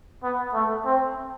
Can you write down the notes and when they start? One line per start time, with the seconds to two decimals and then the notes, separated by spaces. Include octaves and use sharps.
0.24 B3
0.54 A3
0.85 C4